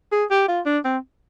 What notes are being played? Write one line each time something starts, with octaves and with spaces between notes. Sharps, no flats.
G#4
G4
F4
D4
C4